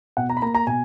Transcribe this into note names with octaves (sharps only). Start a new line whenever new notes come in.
B2 F#5
A#5
B5
A#3 A#5
A#5
B2 G#5